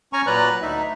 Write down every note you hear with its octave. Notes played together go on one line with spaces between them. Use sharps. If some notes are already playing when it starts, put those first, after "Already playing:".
C#4 G#5 A#5 C#6
A#2 F#3 B4 D5 A#5 F#6
D2 D#4 E5